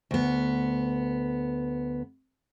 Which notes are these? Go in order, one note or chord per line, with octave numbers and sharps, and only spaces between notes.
D2 B3